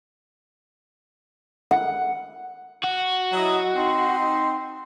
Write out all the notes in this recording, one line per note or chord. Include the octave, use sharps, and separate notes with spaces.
F#5
F#4
F#3 E4 D#5
C4 D#4 C6